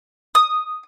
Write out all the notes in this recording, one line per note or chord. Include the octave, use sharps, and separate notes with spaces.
D#6